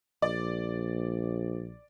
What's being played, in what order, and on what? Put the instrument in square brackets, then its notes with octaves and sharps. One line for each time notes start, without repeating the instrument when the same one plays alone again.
[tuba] A#1 [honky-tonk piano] D5